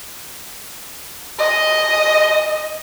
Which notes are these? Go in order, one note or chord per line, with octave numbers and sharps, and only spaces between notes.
D#5